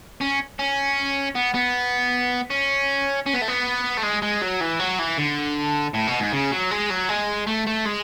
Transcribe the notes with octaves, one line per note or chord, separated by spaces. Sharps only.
C#4
C#4
B3
B3
C#4
C#4
B3
A3
B3
A3
G#3
G#3
F#3
E3
F#3
E3
D3
A2
B2
G#2
C#3
F#3
G#3
F#3
G#3
A3
A3
G#3